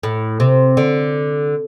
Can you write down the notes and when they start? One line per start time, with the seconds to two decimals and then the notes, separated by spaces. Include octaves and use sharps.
0.03 A2
0.40 C3
0.77 D3